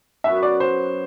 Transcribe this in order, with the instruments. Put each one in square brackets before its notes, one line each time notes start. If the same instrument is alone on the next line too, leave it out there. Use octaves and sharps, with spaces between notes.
[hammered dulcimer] F#2 F#3 B3 [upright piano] E5
[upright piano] D5
C5